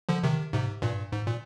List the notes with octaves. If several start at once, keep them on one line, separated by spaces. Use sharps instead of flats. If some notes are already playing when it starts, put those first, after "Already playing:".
D3 F3
C3 D#3
G#2 C3
G2 A#2
G#2
A#2